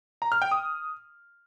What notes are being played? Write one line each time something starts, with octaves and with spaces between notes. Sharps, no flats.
A#5
F6
G5
D#6